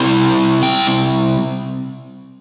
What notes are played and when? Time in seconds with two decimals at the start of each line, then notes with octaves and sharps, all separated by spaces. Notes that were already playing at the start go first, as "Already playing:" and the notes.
Already playing: C3 G3 C4 E4
0.63 G5